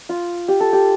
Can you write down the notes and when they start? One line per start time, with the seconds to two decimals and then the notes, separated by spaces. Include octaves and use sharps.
0.09 F4
0.48 G4
0.60 A4
0.73 G4